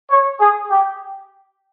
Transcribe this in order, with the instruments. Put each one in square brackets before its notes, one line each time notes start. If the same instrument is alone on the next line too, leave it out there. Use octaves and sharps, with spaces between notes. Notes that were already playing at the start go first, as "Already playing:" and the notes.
[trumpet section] C#5
G#4
G4